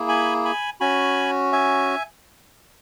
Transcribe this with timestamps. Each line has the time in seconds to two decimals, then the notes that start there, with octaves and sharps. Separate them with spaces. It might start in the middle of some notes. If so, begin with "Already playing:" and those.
Already playing: A#3 E4 G#4
0.08 G#5 B5
0.45 G#5 B5
0.80 C#4 F#4 G#5 B5
1.52 E5 G#5